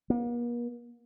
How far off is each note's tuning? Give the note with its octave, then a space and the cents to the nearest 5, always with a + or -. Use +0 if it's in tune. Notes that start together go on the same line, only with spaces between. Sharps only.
A#3 +45